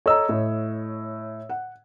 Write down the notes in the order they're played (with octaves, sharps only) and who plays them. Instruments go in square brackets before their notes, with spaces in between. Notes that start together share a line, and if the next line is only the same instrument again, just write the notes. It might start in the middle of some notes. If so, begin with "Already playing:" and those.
[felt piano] A4 A#5 [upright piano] C#5 D#5 E6
[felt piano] A2
F#5